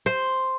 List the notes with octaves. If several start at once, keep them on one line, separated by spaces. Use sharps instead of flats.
C5